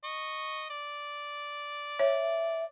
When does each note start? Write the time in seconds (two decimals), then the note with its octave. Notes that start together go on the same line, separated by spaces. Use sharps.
0.04 D#5 C#6
0.70 D5
1.99 C#5 E5